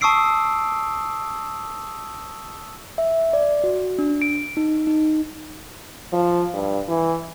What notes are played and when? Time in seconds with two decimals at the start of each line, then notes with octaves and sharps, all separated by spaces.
0.01 A5 C#6 D#6 E6 C7 D7
2.98 E5
3.33 D5
3.64 F#4
3.99 D4
4.22 D7
4.57 D#4
4.87 D#4
6.13 F3
6.54 G2
6.88 E3